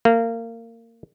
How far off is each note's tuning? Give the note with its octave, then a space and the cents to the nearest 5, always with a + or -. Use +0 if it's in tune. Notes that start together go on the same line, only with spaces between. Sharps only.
A#3 -25